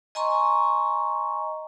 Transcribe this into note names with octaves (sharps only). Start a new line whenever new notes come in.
D#5 G#5 A#5 C6 C#6